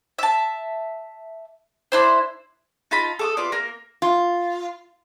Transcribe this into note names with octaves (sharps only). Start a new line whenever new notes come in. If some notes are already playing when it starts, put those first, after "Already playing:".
E5 A5
D4 E4 C5
D#4 F4 A5 B5
A4 D6 D#6
F4 B4 D5
A#3 A#4
F4